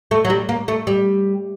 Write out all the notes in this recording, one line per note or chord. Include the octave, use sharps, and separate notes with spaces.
A3
F#3
G3
A#3
A3
G3